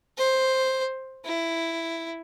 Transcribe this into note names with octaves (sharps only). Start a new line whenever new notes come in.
C5
E4